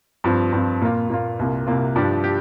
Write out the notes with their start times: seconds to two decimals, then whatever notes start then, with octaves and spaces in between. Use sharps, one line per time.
0.24 G2 F3 C4
0.53 G2 F3 C4
0.81 A#2 A#3 F4
1.10 A#2 A#3 F4
1.39 C2 C3 A#3 F4
1.67 C2 C3 A#3 F4
1.96 G2 F3 D4 G4
2.24 G4